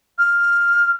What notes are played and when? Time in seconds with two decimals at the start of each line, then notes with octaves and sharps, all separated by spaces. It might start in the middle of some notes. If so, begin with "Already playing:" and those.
0.18 F6